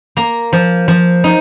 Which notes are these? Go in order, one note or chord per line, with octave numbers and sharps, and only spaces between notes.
A#3 A#5
F3
F3
D#4